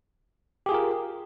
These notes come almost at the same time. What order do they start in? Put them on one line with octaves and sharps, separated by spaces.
G4 G#4 F4 A#4